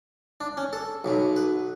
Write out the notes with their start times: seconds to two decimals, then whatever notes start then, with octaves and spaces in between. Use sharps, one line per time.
0.41 D4
0.57 C#4
0.73 A4
1.04 B1 B2 F#3
1.36 B4